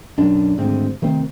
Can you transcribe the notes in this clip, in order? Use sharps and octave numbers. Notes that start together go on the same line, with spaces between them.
B1 F#2 D4
D#1 D2 G#2 C4
C3 D#3 A3 C4